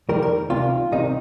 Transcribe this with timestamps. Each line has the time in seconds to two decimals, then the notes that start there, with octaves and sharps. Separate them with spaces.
0.09 F2 D#3 G3 A#4
0.22 A#4
0.50 C2 C3 D#3 F4
0.92 C2 C3 D#3 D#4